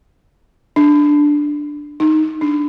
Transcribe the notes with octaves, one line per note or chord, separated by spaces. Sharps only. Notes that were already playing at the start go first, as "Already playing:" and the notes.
D4
D#4
D4